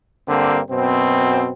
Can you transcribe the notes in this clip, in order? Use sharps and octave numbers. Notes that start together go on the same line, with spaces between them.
G2 D3 A#3 C4
F#2 B2 C4